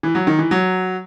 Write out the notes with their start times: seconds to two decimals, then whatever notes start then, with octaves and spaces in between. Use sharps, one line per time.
0.03 E3
0.15 F#3
0.27 D#3
0.39 E3
0.51 F#3